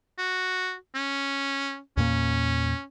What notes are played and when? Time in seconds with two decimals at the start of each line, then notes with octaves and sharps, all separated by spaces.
0.18 F#4
0.95 C#4
1.97 E2 A#2 A#3 C#4